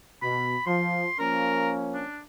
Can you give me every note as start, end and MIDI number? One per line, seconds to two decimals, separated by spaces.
0.22 0.55 47
0.22 0.63 83
0.66 1.08 53
0.66 1.16 84
1.19 2.05 53
1.19 2.05 58
1.19 2.05 61
1.19 1.69 70
1.94 2.19 62